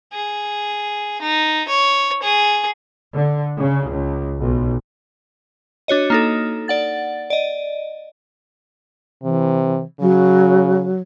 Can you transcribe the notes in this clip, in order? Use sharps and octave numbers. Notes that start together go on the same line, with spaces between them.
G#4
D#4
C#5
G#4
D3
C#3
C#2
B1
D4 F#4 C#5 D#5
A#3 D#4 A4
D5 F#5 A6
D5 D#5
C3 E3
C#3 F#3